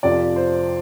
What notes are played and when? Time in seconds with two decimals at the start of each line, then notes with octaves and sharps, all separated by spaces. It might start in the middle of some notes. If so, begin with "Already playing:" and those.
0.03 F2 C3 F3 D5
0.36 C5